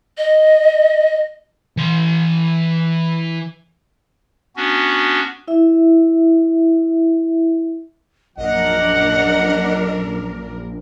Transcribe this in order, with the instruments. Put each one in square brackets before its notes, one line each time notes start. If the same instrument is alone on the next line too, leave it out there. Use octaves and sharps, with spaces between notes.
[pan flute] D#5
[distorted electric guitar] E3 C6
[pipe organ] B3 C#4 D4 F#4
[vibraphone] E4 E5
[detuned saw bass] A#1 [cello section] F#2 D4 A#4 [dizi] D#5 [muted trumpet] F#5